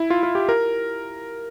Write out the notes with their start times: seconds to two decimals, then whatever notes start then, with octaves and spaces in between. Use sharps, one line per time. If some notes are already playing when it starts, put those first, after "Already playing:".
Already playing: E4
0.10 F4
0.23 F4
0.35 G4
0.49 A#4